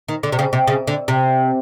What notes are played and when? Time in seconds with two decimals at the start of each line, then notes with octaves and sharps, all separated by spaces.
0.08 D#3
0.23 D3
0.32 C3
0.39 C#3
0.53 C3
0.67 C#3
0.87 D3
1.08 C3